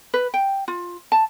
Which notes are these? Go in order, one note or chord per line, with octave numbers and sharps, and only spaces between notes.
B4
G5
F4
A5